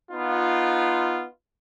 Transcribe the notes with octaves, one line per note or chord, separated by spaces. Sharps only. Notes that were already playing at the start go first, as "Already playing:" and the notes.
B3 D#4 F4